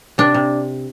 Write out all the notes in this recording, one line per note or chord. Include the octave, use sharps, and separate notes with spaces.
C3 D4
C3